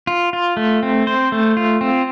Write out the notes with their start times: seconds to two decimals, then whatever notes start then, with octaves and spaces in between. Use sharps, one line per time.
0.07 F4
0.33 F4
0.57 A3
0.83 C4
1.07 C5
1.32 A3
1.57 F4
1.81 C4